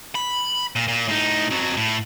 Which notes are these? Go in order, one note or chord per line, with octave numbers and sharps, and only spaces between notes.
B5
A#2
A#2
A2 D#4
F2 F#3
A2